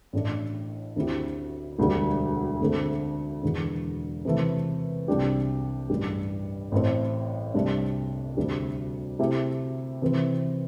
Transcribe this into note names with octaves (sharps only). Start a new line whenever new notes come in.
A1 A2 A3 D4
D2 D3 C4 E4 G4
E1 D2 D3 G3
D2 D3 A3 C4 A4
E1 E2 D3
C3 E3 A3
C2 C3 G3 D4 G4
A1 G2 G3
A1 A2 A3 C4
C2 C3 A3 D4 G4
D2 C3 G3 D4 G4
C3 A3 E4 G4
C3 E3 C4 E4